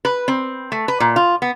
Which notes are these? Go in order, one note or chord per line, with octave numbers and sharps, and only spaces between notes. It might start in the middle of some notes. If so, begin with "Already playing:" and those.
B4
C4
A3
B4
A#2
F4
B3